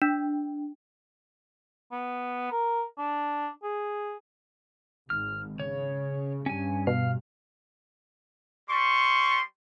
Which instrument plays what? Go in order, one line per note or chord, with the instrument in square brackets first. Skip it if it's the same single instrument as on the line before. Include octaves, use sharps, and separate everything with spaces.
[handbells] D4
[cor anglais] B3
A#4
D4
G#4
[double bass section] G#1 [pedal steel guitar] F6
[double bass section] C#3 [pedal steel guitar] C#5
[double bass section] G2 [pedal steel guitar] C#4 G#5
[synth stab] B2 [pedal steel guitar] F5
[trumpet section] G3 C6 C#6